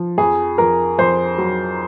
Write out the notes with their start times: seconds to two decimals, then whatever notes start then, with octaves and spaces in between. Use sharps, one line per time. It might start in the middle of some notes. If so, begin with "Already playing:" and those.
Already playing: F3
0.18 F2 G#4
0.58 F2 A#4
0.99 F2 C5
1.38 F#3